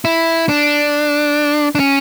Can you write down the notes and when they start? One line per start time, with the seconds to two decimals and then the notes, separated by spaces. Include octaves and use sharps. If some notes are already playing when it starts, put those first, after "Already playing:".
0.05 E4
0.49 D4
1.75 D4
1.80 C#4